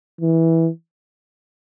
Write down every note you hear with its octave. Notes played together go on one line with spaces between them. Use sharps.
E3